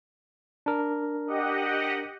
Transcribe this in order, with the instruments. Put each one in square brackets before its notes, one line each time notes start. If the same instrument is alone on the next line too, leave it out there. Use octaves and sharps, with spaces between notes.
[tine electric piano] D4 A#4
[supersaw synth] G4 D#5 F#5